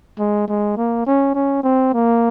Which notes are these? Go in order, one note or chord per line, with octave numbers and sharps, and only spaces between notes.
G#3
G#3
A#3
C#4
C#4
C4
A#3